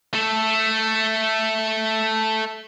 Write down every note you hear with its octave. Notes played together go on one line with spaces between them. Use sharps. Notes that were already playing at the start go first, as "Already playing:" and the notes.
A3 A4